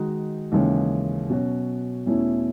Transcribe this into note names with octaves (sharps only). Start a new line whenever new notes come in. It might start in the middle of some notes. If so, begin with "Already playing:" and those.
Already playing: D#3 G#3 D#4 F#4
D#2 C#3 E3 G#3 C#4
B2 F#3 C#4 F#4
E2 B2 A3 C#4 E4